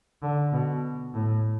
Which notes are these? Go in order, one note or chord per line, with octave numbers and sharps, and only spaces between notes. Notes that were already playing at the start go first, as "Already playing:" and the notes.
D3
B2
A2